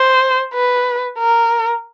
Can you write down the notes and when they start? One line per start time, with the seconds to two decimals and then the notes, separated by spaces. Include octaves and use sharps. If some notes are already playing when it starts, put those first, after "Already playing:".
Already playing: C5
0.54 B4
1.19 A#4